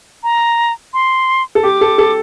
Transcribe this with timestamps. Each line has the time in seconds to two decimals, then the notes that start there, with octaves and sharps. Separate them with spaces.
0.23 A#5
0.94 C6
1.55 A4
1.63 G4 D6
1.81 A4
1.98 A4